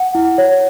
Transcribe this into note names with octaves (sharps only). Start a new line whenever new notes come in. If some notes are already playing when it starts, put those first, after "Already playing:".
Already playing: F#5
E4
C#5